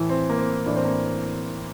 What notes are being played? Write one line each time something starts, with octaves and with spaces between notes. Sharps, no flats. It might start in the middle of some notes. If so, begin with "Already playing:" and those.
Already playing: A2 E3
C4
A#3
C4
A2 E3 D4
C4
A#3